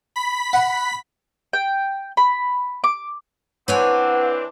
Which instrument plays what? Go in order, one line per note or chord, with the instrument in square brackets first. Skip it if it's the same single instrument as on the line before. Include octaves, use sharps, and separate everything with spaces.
[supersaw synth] B5 B6
[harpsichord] F#5
[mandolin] G5
B5
D6
[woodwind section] E3 C4 D4 [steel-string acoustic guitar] B4 C#5 G#5 [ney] F#5